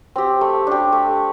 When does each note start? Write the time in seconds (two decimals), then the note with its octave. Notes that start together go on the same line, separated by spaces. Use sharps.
0.16 C4 G4
0.41 A3
0.67 D4 G4
0.92 A3